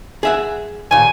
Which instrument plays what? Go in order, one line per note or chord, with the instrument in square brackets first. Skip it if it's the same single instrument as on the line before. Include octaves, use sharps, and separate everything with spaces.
[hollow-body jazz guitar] G#4 E5 F#5
[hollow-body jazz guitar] D#2 A#2 [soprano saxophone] G#5